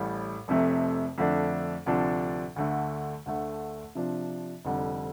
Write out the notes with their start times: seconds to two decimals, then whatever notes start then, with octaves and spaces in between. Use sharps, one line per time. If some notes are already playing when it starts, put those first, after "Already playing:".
Already playing: A1 A2 G3
0.48 F1 F2 C3 A3
1.18 F2 D3 A3 D4
1.86 D2 C3 F3 D4 A4
2.56 D2 D3 A3
3.26 D2 D3 A3
3.95 C3 F3 D4
4.65 F1 F2 D3 G3